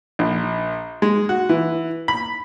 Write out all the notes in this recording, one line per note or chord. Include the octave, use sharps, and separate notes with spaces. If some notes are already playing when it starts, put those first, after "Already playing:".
A#1
G#3
F#4
E3
B5